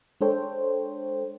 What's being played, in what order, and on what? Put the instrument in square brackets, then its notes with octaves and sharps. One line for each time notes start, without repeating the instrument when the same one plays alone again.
[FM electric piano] G#3 D4 A4 C5 C#5 G5